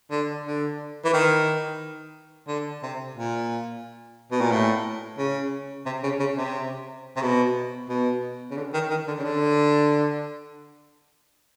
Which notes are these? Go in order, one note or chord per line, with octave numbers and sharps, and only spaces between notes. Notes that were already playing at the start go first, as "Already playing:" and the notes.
D3
D3
E3
D#3
D3
C3
A#2
B2
A#2
A2
C#3
C3
C#3
C#3
C3
C3
B2
B2
C#3
D3
D#3
D#3
D3
C#3
D3